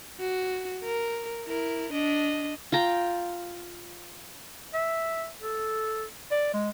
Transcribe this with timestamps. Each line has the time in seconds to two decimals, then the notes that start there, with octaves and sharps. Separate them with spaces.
0.20 F#4
0.84 A#4
1.47 E4 A#4
1.92 D4 D#5
2.72 F4 G5 A#5
4.74 E5
5.41 A4
6.31 D5
6.53 G#3